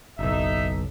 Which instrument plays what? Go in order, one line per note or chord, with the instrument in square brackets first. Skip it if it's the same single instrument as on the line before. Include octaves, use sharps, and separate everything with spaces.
[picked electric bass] F#1 B1 [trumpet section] D#4 E5